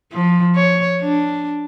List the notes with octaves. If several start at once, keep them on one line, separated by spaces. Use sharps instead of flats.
F3
C#5
D4